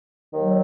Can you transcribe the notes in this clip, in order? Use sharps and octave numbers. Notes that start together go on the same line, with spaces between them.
D#2 D#3 F#3